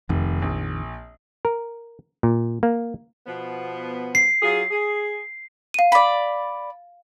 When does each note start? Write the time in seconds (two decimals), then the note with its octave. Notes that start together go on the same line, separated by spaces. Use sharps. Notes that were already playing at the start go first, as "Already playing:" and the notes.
0.09 F1 F2 D#3
0.42 A#1
1.45 A#4
2.23 A#2
2.63 A#3
3.26 B2 F3 B3
4.15 C7
4.42 F#3 F4 G#4
4.70 G#4
5.74 F5 D#7
5.92 D5 B5